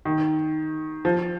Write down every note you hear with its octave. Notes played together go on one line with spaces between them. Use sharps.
D#3
F3